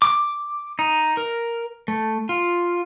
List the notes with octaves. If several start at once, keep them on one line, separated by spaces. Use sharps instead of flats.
D6
D#4
A#4
A3
F4